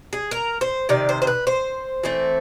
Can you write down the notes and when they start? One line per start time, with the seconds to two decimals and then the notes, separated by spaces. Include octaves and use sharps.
0.13 G#4
0.31 A#4
0.61 C5
0.89 C3 D#3 D5
1.09 C5
1.22 C5
1.27 B4
1.47 C5
2.04 E3 A3 C4